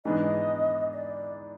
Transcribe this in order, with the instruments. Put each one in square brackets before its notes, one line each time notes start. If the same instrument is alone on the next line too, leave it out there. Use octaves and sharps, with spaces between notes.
[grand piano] G#2 E3 G#3 B3 D4 [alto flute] D#5
[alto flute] D5